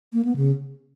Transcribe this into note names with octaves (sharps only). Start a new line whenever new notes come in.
A#3
B3
C#3